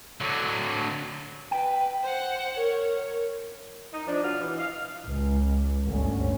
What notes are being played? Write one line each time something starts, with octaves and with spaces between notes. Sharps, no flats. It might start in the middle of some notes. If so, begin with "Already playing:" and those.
D3 F#3
B4 G5
C5 F#5
A#4 C#5
D#4
F3 D4
B2 F#3 B3 F4 F5
E3
D#5 F5
C#2
G1 D2 C#4